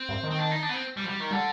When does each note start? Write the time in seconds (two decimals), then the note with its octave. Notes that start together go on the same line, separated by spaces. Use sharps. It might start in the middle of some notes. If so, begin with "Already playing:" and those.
Already playing: C4
0.09 G2
0.23 D#3
0.30 C4
0.39 D4
0.51 D#4
0.63 D4
0.69 B3
0.73 C4
0.97 G3
1.04 F3
1.08 G3
1.20 D#3
1.31 D3 G3